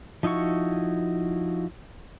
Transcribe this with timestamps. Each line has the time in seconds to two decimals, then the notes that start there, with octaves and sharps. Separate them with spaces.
0.23 F3 D#4 E4 F#4 C#6